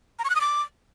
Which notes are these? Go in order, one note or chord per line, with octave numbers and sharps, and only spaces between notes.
A#5
C#6
F#6
D#6
D6